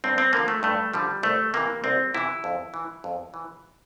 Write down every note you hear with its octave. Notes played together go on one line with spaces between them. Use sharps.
G2 C4
C4
D3 F3 A#3
A3
G2 A3
D3 F3 G3
C2 A3
C3 E3 A#3
C2 C4
C3 E3 E4
F2
E3
F2
E3